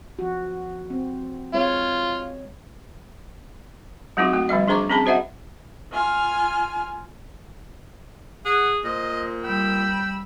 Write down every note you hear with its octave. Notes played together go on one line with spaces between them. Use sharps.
F3 F#4
C4
G#3 C4 F4 C#5
F#3 G#3 C4 D#4 F4 F#4
A3 F#4
D3 F3 G3 D#5
D4 G#4 C5 A#5 C#6 D6
C4 C#4 G#4 A5 B5
F#4 C5 D#5 E5 F#5
F4 G#5 F6
G#4 F#5
A#2 C5 D#5
G3 G5 B5 E6